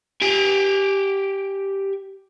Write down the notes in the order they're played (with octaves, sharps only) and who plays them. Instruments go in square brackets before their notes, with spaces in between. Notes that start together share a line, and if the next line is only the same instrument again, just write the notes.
[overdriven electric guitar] G4 G#5